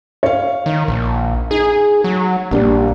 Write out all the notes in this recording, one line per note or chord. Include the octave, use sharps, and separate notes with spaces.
C#5 F5
D#3
A#1
D#4 G#4
F#3
A#1 G3 A#3 D4